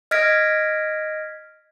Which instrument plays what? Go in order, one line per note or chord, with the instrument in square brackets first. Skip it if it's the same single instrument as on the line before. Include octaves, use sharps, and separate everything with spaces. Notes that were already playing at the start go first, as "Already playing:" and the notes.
[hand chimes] D#5 F6 G#6 A#6 B6 D7